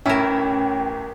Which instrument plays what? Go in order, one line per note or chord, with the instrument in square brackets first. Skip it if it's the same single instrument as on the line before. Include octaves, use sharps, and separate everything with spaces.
[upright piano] A1 E7 [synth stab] C#4 [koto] E4 A#4 [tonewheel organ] G5